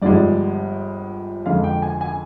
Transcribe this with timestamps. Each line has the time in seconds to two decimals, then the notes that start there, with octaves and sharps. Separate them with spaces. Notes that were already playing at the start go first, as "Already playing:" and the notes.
0.02 G1 G2 F3 G#3 D5
1.46 F2 D3 G#3 F5
1.64 G5
1.82 G#5
2.01 G#5